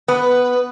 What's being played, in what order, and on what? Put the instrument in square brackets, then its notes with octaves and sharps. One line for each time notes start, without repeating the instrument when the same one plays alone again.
[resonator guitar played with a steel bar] B3 [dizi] B4